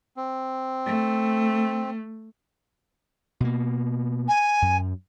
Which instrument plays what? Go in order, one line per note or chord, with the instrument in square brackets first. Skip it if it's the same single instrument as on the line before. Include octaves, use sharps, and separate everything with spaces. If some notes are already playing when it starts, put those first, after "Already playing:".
[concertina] C4
[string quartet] A3
[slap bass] B2 A#3
[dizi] G#5
[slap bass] F#2